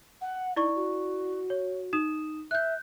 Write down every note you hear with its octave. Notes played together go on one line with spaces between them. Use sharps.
F#5
D#4 E4 D5 C#6
F#4
C#5
D#4 D#6 E7
E5 F#6 G6